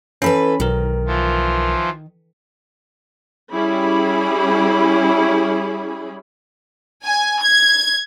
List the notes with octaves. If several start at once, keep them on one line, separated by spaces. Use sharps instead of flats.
E3 C#4 A4 B4 B5
B1 D#3 A#4
E3 F3 F4
G3 C#4 E4 G#4 B5
G#5
G#6